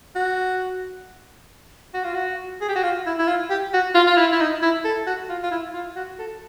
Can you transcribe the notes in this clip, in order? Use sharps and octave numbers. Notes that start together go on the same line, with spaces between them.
F#4
F#4
F4
F#4
G#4
G4
F#4
F4
E4
E4
F4
G4
F#4
F4
F4
E4
E4
D#4
E4
A4
F#4
F4
F4
E4
F4
F#4
A4